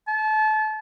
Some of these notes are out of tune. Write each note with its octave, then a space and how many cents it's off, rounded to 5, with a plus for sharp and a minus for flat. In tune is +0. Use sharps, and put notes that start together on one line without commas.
A5 -30